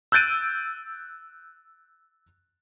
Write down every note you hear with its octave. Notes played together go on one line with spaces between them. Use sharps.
E6 F#6 G6 A6 D7 D#7